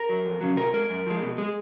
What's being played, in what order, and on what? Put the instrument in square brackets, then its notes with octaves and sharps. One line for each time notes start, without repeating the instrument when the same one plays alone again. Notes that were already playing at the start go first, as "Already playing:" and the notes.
Already playing: [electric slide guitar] A#4
F#3
F2
C#3 F#3
B2 A#4
G#3 A#4
F#2
F3 G#3
B2
G#3